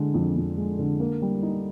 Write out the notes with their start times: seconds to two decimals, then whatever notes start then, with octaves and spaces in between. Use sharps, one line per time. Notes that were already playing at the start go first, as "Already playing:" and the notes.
Already playing: D3 G#3
0.14 F2
0.36 F2
0.57 G#3
0.79 D3
1.00 A#3
1.22 G3
1.43 D#4